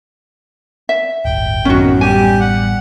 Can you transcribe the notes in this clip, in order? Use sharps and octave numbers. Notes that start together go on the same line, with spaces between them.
E5
D1 G1 G5
A1 F#2 D#3 B3 C#4 F#4
G3 G4 G#5
F#5